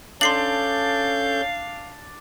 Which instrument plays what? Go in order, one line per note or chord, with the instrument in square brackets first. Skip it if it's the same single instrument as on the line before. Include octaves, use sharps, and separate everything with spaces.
[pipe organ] C#4 A4 G6 [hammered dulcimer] D4 [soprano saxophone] F5 [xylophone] C6 C7 F#7